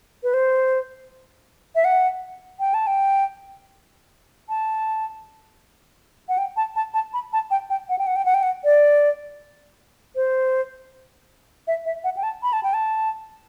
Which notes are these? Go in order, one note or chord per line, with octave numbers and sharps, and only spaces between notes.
B4
C5
E5
F#5
G5
A5
G5
A5
F#5
G5
A5
A5
A5
B5
A5
G5
G5
F#5
G5
F#5
G5
F#5
G5
F#5
D5
C5
E5
E5
F#5
G5
A5
B5
A5
G5
A5